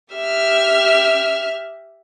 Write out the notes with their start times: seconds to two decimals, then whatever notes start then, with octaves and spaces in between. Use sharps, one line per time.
0.13 G4 E5 F6